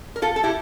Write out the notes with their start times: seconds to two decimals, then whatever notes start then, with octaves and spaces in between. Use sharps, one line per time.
0.16 A#4
0.22 F4 A4
0.36 A4
0.44 E4 G4